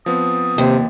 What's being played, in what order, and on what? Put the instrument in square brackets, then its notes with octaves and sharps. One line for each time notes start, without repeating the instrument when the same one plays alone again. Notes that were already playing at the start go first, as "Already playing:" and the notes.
[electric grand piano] F3 B3 C4 [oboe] D#6
[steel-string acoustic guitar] D#2 [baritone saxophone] C3